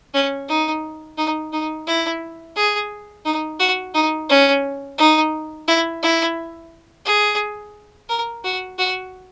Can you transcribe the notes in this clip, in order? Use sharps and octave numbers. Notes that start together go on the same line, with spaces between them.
C#4
D#4
D#4
D#4
E4
G#4
D#4
F#4
D#4
C#4
D#4
E4
E4
G#4
A#4
F#4
F#4